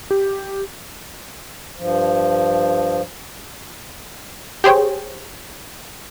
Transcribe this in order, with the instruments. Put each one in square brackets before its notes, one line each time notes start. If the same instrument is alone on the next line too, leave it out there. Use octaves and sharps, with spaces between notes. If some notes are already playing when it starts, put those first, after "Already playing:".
[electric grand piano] G4
[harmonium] G2 F3
[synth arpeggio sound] G4 G#4 C5 C#5 G5